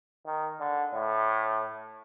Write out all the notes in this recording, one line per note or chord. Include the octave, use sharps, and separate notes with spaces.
D#3
D3
A2